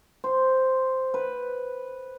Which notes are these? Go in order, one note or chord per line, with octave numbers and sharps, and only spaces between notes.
C5
B4